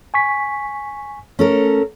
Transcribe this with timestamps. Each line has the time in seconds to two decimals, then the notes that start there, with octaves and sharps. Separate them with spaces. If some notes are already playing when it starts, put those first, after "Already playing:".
0.14 G#5 C#6 B6
1.39 A3 C#4 A4 A#4